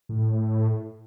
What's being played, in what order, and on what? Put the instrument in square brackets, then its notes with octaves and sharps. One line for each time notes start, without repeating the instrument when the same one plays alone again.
[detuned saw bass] A2